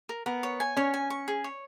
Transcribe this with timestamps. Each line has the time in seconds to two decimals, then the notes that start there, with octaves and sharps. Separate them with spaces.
0.09 A#4
0.26 B3 A#4
0.43 C#5
0.60 G#5
0.77 C#4 C#5
0.94 G#5
1.10 C#6
1.28 G#4
1.44 C#5